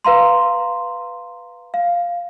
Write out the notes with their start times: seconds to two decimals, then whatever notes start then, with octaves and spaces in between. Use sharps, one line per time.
0.05 B4 F5 A#5 C6
1.74 F5